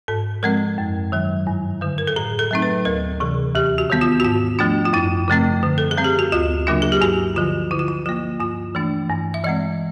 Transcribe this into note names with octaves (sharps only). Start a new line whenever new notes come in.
G#2 A4
F3 G#3 C4 A#4
F#2
D#3 F#3
G2
D3 G3
A#4
A4
A2 G#4
A4
F#3 A3 C4 D#4
B4
D2 A#4
C3 E3 G#4
D#2 G4
F#4
D#3 G3 B3
F4
F#4
G#2 F4
F3 A3 D4 F4
F4
F#2 E4
C#3 F3 A3 C4
D3
A4
G#4
G3 C4
G4
F#4
D2 F4
C#3 F#3 A#3 D4 F4
G#4
G4
G2 F#4
D3 F3 F4
D3 E4
F4
E4
F3 A#3 F4
G2 F4
E3 A3 D4
G2
E5
E3 G#3 C4 D#5